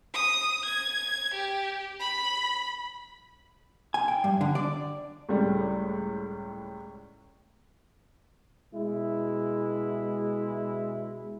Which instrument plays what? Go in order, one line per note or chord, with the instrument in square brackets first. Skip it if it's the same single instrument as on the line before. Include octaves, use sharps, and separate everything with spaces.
[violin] D#6
G#6
G4
B5
[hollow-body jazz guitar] G#5
G5
G2
D3
D5
[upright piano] C#2 A2 G3
[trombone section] B2 G#3 E4